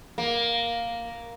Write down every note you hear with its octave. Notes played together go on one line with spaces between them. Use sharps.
A#3